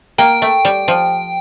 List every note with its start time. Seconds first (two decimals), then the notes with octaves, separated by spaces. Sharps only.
0.18 A#3 G5
0.42 A3
0.65 G3
0.88 F3